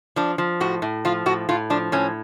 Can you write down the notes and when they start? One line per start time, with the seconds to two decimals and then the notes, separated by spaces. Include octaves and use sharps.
0.16 F3 D4
0.38 F3
0.60 A2 F#4
0.82 A2
1.05 F3 F4
1.26 A2 F#4
1.49 A2 F4
1.70 F3 D4
1.92 A2 C#4